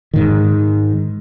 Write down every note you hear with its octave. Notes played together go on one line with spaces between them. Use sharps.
G#2 D#3